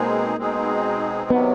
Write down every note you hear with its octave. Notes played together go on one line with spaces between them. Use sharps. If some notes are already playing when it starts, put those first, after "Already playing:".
Already playing: B2 G#3 A#3 C4 D#4 G#4
B2 G#3 C4 D#4 G#4
C3 D#3 F#3 B3